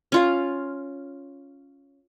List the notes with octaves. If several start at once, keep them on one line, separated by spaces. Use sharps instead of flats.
C#4 F4 F5